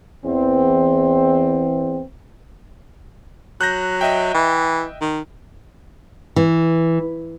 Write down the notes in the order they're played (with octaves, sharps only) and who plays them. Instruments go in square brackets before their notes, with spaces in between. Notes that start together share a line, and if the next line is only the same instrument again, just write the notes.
[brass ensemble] E2 C4
[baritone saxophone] F#3 [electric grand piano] F#6 G6 A#6
[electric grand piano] D#5 E5 G5
[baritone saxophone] E3
D#3
[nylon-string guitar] E3